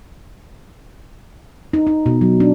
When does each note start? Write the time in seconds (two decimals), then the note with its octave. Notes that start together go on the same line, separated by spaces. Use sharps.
1.73 D#4
1.87 D#4
2.06 B2
2.21 F#3
2.40 D4